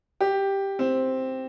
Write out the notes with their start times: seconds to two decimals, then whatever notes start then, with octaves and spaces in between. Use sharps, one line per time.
0.21 G4
0.79 C4